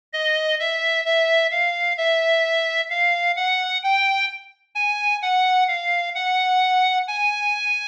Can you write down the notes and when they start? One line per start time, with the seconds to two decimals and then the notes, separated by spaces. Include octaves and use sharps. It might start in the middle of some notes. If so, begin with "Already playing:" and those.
0.13 D#5
0.59 E5
1.05 E5
1.52 F5
1.97 E5
2.90 F5
3.36 F#5
3.83 G5
4.75 G#5
5.22 F#5
5.68 F5
6.15 F#5
7.08 G#5